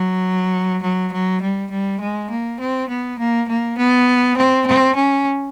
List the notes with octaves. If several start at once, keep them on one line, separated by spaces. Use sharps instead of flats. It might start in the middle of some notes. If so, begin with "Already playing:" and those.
Already playing: F#3
F#3
F#3
G3
G3
G#3
A#3
C4
B3
A#3
A#3
B3
C4
C4
C#4